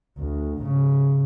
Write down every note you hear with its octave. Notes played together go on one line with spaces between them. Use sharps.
D2
G#2 C#3